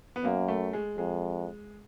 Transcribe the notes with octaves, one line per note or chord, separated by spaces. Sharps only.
B3
F#2 A#3
A3
G#3
F2 G#3